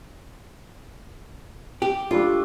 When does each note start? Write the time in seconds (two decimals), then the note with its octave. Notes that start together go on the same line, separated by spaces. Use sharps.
1.82 G4
2.11 G3 A3 D4 F4